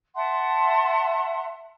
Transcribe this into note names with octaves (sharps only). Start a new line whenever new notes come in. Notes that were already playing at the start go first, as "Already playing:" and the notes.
E5 F#5 A5 C6